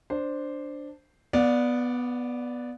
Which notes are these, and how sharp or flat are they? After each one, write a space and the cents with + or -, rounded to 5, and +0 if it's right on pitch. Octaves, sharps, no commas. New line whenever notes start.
D4 +0 C5 +0
B3 +0 D5 +0 F5 +45